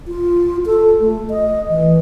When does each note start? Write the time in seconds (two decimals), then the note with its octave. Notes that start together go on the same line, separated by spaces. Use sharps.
0.08 F4
0.66 A4
1.00 A3
1.30 D#5
1.70 E3